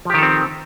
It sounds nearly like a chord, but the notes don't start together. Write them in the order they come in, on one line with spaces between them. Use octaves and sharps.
F3 G4 D#3 A4 C4